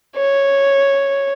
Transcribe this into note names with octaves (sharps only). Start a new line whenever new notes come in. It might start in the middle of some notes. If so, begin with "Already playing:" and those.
C#5